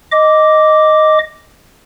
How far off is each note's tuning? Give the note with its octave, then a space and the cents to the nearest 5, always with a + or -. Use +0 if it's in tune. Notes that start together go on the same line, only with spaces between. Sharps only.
D#5 +0 D6 -5